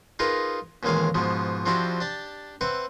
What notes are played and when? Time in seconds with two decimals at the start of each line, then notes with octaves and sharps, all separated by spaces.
0.19 D#4 F4 G#4 A#4 B4
0.83 A1 D#2 A#2 G#3 G#4 F5
1.14 G#2 B2 F3 B3
1.66 F3 C4 D4 E4 F#4 G4
2.01 D4 G4 A5
2.61 C4 B4 E5 F#5